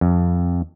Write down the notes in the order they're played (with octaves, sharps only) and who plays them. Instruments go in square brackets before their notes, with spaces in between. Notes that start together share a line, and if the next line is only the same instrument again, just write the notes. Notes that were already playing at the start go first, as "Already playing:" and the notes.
[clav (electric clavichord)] F2